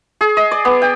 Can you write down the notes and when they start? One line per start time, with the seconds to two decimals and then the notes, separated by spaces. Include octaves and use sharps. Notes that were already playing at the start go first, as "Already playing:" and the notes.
0.21 G#4
0.37 D#5
0.51 D5
0.65 B3
0.82 G5